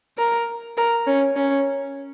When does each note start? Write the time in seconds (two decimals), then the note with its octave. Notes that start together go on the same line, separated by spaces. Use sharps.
0.18 A#4
0.77 A#4
1.07 C#4
1.36 C#4